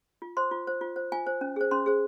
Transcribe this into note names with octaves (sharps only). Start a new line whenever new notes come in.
F4
C5 C6
F4
C5
F4
C5
F4 G#5
C5
C#4
G#4 C5
C#4 C6
G#4 C5